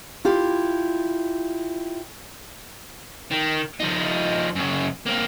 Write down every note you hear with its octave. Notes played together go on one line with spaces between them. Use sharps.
E4 F4 G4
D#3
F3 D#4
F#2 C#3
A#3 C4